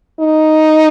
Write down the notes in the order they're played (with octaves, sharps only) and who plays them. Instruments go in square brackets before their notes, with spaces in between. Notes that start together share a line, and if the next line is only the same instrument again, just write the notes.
[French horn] D#4